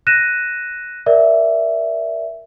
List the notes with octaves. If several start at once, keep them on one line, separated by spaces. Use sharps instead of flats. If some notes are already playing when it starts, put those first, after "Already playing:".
F#6 A#6 D#7 E7
A#4 D5 E5